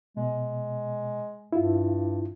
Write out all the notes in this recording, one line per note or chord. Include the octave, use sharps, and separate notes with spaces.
B2 G#3
G2 E4 F4